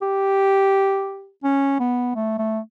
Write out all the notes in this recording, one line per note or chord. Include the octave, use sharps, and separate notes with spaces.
G4
C#4
B3
A3
A3